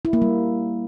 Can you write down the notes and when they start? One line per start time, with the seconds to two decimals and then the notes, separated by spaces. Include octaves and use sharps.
0.05 E4
0.13 A#3
0.22 G3